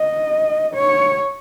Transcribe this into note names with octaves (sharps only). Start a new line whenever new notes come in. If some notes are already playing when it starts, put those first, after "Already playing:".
Already playing: D#5
C#5